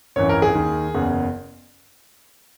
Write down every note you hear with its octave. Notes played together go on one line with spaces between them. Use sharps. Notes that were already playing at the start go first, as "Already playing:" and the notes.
G#1 F#2 E3 C#5
A#4
G#4
D#2 D#3
F#1 E2 C#3